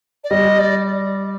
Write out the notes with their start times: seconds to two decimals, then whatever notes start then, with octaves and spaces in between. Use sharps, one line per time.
0.24 D5
0.30 G3 D#5
0.59 D5